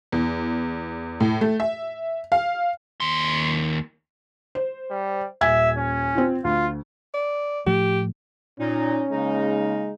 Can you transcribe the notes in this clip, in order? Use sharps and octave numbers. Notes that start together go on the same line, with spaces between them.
E2
A2
A3
E5
F5
D#2 C6
C5
G3
D#1 E5 G#5 G#6
C#4
C4 F4
D2 F4
D5
A2 F3 A3 G4
A#2 C#4 D#4
C#3 G#3 A#3 D#4